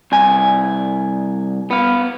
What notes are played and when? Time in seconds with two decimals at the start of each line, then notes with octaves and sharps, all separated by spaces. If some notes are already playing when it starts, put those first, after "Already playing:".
0.12 C2 G#5
1.71 B3 F5